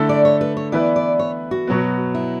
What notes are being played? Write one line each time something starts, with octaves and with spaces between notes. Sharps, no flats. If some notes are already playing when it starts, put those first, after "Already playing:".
Already playing: D3 A3 E4 A4
D5
C#5
B4
C#5
E3 B3 E4 B4 D5
D5
C#5
F#4
B2 F#3 B3
E4